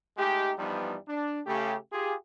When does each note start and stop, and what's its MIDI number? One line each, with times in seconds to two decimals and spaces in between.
0.17 0.52 56
0.17 0.52 57
0.17 0.52 63
0.17 0.52 67
0.58 0.96 43
0.58 0.96 52
0.58 0.96 53
0.58 0.96 55
0.58 0.96 59
0.58 0.96 63
1.08 1.41 62
1.47 1.76 49
1.47 1.76 57
1.47 1.76 67
1.92 2.14 65
1.92 2.14 67
1.92 2.14 68